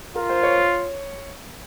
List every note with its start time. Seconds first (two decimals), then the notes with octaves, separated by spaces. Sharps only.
0.16 F4 A#4
0.30 C5
0.43 C#5